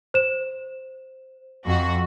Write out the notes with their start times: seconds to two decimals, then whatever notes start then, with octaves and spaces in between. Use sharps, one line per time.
0.14 C5 E7
1.64 F2 F#4